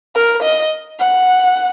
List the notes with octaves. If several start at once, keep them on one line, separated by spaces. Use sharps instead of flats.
A#4
D#5
F#5